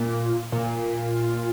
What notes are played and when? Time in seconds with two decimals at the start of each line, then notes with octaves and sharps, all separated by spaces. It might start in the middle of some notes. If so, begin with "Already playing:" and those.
Already playing: A#2
0.52 A#2